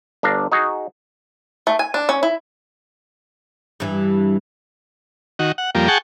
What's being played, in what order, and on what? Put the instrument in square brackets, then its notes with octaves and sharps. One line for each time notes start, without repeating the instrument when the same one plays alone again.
[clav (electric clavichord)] G1 D4 F5 A#5
D#4 F#4 G#4
[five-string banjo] A3
G#5
D4
C#4
E4
[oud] G2 E3
[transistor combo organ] D#3 F#4
F#5
F2 G3 A#3
G#4 F#5 G5 A5 C#6